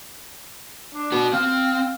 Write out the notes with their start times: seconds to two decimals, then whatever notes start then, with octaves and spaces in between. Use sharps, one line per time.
0.94 D4
1.12 F#4 B4
1.33 C4 F5